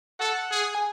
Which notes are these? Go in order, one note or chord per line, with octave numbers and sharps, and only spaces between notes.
A4 F#5
G#4
G#5